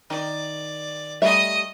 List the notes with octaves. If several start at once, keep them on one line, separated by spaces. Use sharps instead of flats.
D#3 D5
G3 A3 D#5 E5 D#6